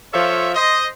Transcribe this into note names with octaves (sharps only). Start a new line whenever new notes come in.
F3 F4 A4 C#5 E5
C5 D#5